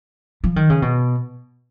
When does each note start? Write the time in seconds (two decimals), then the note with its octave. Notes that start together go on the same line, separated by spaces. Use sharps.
0.44 F3
0.56 D#3
0.70 C#3
0.82 B2